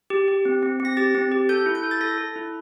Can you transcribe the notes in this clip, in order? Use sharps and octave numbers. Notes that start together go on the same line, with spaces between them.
G4
G4
C4
C4
C4
A#6
G4 A6
C4
G4
A4 G6
E4
G6
A4
A6
A4 A#6
A4
E4